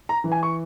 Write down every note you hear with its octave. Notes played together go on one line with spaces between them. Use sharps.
A#5
E3
G#5
C#6